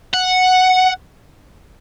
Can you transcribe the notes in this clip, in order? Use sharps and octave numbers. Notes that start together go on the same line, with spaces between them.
F#5